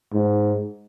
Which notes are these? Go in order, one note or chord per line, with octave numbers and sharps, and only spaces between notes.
G#2